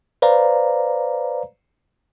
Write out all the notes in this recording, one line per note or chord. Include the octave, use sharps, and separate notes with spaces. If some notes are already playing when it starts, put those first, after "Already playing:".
B4 C5 D5 F5 A#5